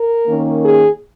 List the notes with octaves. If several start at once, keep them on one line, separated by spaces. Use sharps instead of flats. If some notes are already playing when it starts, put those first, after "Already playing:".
Already playing: A#4
D#3 A#3 C#4
G#4